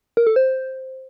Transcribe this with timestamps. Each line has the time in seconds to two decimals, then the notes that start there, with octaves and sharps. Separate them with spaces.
0.17 A#4
0.27 A4
0.36 C5